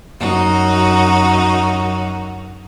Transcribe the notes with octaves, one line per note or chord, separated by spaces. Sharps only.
F#2 D#4 F#4